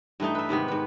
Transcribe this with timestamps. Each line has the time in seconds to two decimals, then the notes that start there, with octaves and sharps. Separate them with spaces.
0.20 G2 E3 A3 D#4
0.35 B4 E5
0.49 G#2 C3 D#3 B3
0.68 G#2 B4